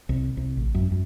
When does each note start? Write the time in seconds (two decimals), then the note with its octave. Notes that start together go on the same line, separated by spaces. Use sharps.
0.09 C2
0.37 C2
0.57 A1
0.74 F#2
0.92 F#2